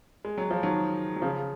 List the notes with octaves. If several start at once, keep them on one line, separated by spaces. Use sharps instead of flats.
G#3
F#3
F3
D#3 F#3
F#3
C#3 F3